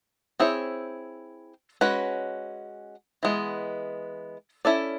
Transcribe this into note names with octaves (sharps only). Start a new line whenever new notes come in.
C4 E4 G#4 C#5
G#3 C#4 F#4 B4
E3 G#3 B3
C#4 E4 A4 D5